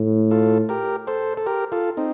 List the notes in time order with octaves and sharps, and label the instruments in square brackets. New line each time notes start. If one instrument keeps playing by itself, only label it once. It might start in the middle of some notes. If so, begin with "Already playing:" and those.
Already playing: [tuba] A2
[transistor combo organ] F4 A4
G4 A#4
A4 C5
A4
G4 A#4
F4 A4
C4 D#4